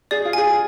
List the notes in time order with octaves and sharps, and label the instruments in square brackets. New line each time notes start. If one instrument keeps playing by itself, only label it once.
[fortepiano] G#4 [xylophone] D5
[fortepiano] F4
[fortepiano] G#4 [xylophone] G#5